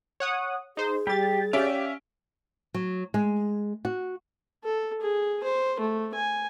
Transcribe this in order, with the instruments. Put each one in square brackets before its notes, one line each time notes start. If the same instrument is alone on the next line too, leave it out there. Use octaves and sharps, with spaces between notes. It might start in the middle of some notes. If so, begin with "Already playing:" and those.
[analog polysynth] C#5 F#5 D#6
[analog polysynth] D#4 C5 [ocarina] G#4
[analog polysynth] G3 A6 [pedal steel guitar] G4
[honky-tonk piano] C#4 E5 D7 [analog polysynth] G4 D5 [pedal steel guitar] F5
[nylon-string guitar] F#3
G#3
F#4
[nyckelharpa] A4
G#4
C5
A3
G#5